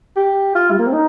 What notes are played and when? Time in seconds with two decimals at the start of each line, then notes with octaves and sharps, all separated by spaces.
0.16 G4
0.55 F4
0.71 G3
0.79 A#3
0.87 C4
0.93 D#4